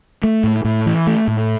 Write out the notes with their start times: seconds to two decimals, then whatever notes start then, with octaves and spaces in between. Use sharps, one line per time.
0.23 A3
0.44 A2
0.65 A2
0.86 E3
1.07 A3
1.28 A2